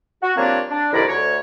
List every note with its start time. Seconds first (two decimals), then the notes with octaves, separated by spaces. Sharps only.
0.21 F#4
0.36 F3 G3 A#3 C4 D4 C#5
0.70 D4
0.92 C2 F2 D#3 E4 D5 A#5
1.07 D2 C#5